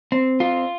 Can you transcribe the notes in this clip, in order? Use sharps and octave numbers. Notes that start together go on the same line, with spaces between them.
C4
F4